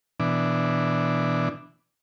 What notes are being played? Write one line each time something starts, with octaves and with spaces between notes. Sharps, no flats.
B2 E3 D4